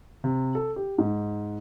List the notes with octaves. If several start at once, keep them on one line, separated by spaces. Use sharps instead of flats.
C3
A4
G4
G#2